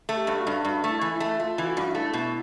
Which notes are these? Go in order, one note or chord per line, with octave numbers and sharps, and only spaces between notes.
A3
G4
G2
F#4
G2
G2
A3
E4
E3
E4
A3
A3 F4
E3
F#4
G2
E4
A3
B2